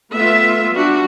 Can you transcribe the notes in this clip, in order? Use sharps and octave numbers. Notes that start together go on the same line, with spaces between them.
A3 B3 F4 E5
G3 D4 F#4